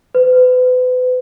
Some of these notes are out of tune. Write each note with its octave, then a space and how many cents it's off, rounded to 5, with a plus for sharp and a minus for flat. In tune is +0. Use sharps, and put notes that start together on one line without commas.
B4 +35